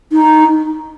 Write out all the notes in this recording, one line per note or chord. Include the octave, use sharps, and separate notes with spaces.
D#4